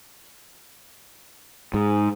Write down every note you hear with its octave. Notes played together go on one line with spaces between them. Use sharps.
G#2